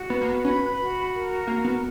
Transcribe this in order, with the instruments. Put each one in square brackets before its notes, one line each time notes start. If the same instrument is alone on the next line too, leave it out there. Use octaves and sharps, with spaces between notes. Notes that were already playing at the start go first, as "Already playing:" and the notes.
Already playing: [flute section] F#4
[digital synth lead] B3 [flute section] B4
[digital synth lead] A#3
B3
[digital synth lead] C#4 [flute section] B5
[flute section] F#4
A#4
[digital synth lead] A#3 [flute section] F#4
[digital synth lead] B3